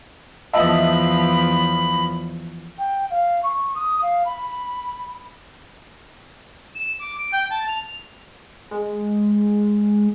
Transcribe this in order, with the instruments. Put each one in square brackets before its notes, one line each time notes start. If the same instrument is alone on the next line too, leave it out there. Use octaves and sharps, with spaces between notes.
[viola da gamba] E2 F3 [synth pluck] D#5 E5 A5 [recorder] B5
[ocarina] G5
F5
C#6
D#6
F5
B5
[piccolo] E7
D6
D7
G5
A5
F7
[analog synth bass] G#3